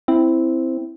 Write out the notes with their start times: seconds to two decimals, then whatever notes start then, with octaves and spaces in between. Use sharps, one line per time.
0.08 C4 E4